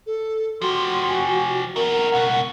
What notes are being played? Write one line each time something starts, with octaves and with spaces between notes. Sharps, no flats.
A4
F3 F#4 G4 C6
G#5
D#4 F#4 A#4
C#2 B2 F#5